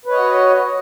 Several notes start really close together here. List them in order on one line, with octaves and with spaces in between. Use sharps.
B4 C#5 D#5 F#4